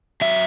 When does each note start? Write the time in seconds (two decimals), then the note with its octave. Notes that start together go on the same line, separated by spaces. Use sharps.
0.21 F#3 E5